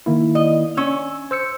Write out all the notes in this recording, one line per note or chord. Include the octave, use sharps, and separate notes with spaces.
D#3 A#3 E4
D#5
C#4 E6
C5 E6 C#7